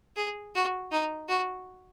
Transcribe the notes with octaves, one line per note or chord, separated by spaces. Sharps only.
G#4
F#4
D#4
F#4